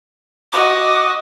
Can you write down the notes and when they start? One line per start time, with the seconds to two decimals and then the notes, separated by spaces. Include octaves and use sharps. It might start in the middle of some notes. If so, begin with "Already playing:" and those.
0.53 F#4 D#5 D6